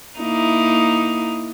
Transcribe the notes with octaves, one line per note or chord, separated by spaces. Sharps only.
A#3 D#4 E4